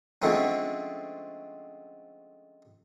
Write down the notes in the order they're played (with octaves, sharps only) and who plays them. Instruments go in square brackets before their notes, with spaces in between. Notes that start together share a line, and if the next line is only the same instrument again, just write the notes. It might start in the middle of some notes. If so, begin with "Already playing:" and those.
[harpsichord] D3 F3 G#3 A3 C4 C#4